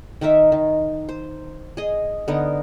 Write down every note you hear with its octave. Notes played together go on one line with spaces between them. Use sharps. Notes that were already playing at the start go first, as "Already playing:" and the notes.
D#3 D#4 A#4 E5
D#3
C5
G#4 D#5
D3 B3 D#4 A#4